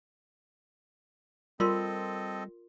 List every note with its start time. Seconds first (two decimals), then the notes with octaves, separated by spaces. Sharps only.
1.60 G3 C4 F4 A4 A#4 D#5 C6